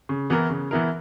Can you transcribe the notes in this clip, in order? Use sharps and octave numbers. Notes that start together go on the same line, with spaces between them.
C#3
E3 B3 E4 A#4
C#3
E3 B3 E4 A#4